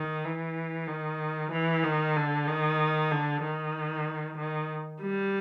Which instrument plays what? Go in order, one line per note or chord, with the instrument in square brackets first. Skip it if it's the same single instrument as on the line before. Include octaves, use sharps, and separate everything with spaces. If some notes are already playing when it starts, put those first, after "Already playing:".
Already playing: [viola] D#3
E3
D#3
E3
D#3
D3
D#3
D3
D#3
D#3
G3